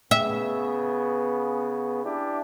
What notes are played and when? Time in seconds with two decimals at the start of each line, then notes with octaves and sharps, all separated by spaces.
0.11 C#3 B3 E5
2.04 D4 E4 G4